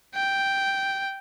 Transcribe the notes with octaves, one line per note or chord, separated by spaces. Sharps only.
G5